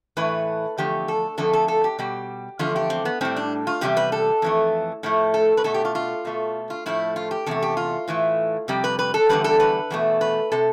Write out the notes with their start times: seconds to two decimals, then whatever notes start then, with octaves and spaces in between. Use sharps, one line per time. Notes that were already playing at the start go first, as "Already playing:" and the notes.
0.17 A2 E3 A3 B4
0.78 E2 D3 F3 A3 G4
1.08 A4
1.38 F2 D3 F3 A3 A4
1.53 A4
1.68 A4
1.84 G4
1.99 B2 G3 G4
2.59 E2 D3 F3 A3 F4
2.76 G4
2.90 C4
3.05 B3
3.21 A2 G3 C4
3.36 D4
3.67 F4
3.81 E2 C3 G3 G4
3.97 B4
4.12 A4
4.42 F2 E3 A3
5.03 A2 F3 A3
5.34 A4
5.57 B4
5.64 B2 A3 A4
5.74 G4
5.85 F4
5.95 F4
6.25 B2 A3
6.70 F4
6.86 A2 F3 A3 E4
7.16 F4
7.31 G4
7.46 E2 C3 A3 A4
7.62 G4
7.77 F4
8.08 A2 E3 A3
8.68 F2 C3 G3 G4
8.84 B4
8.99 B4
9.14 A4
9.29 E2 D3 G3 B4
9.44 A4
9.60 B4
9.91 E2 B2 A3
10.21 B4
10.52 C3 A4